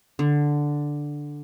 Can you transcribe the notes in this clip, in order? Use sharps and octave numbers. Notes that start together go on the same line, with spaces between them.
D3